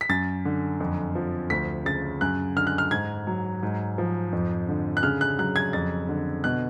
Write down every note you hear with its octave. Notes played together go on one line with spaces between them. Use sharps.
B6
F#2 A6
D3
F2
F3
D2 B6
C#3 A6
F#2 F#6
D3 F6
F#6
F6
G#2 G#6
F#3
G#2
F3
F2
D3
F#6
C#3 F6
F#6
F#3 F#6
G#6
F2 A6
D3
B2 F#6